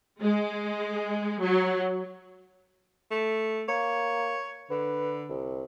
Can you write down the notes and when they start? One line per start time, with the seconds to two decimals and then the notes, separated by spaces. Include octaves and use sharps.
0.20 G#3
1.40 F#3
3.11 A3
3.69 A#3 C#5
4.70 D3 B4
5.30 C2